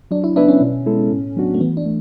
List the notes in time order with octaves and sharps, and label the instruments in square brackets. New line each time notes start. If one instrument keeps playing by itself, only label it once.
[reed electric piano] F#3 [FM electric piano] D4
[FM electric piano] E4
[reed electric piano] B3 E4 B4 E5 [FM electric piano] D4
[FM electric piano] C#4
[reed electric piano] B2
G#3 B3 E4 A4
A2
F#3 B3 D4 F#4
[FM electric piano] A3
[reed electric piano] E3 [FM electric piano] B3
[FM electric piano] D4
[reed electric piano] A3